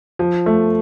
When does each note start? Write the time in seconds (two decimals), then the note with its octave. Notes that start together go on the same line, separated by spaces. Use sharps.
0.19 F3
0.46 A3